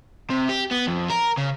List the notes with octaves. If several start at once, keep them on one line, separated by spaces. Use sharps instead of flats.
C3
G4
B3
F2
A#4
C#3